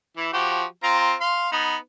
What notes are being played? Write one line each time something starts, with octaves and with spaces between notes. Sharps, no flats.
E3 E4
F3 F#4 G4
C4 F4 A#5
F5 C6
B3 D#4